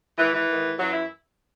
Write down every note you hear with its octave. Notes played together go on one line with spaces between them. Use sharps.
G#2 D#3 E3
E3
G#2 D#3
F#2 E3 F#3
E4